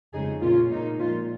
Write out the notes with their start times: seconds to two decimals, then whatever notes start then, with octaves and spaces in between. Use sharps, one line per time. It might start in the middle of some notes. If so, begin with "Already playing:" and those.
0.14 F2 C#3 G#3 D#4 G#4
0.42 A#2 A#3 C#4 F4
0.71 A#2 A#3 D#4
0.99 A#2 F3 G#3 C#4 F4